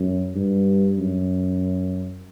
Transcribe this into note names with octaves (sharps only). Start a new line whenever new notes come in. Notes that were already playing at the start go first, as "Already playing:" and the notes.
Already playing: F#2
G2
F#2